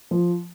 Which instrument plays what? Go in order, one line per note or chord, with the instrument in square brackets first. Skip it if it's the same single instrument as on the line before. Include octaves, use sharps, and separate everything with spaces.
[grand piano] F3